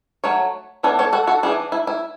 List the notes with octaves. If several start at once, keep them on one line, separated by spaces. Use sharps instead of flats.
F#3 A3 C#5
E3 B3 D4 A4 C#5
A4 C#5
F#4 A4
F#4 A4
E3 B3 D4 E4 G#4
E4
E4